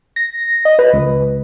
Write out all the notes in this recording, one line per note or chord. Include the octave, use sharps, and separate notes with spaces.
A#6
D#5
B4
C#2